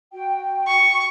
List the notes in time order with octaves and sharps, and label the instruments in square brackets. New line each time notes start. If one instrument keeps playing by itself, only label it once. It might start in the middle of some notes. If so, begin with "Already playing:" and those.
[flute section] F#4 G5
[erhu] C#6